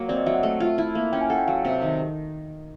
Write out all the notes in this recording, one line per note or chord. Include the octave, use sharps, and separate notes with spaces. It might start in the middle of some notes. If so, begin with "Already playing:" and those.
Already playing: F#3 A#3
C4 D5
D#5
F#3 E5
F#5
A3
F4
E4
A#3
C#4 G5
G#5
A4 F#5
G5
F#3 F5
C3
D#3